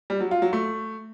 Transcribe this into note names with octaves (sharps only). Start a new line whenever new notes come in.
G3
F#3
F4
F#3
A3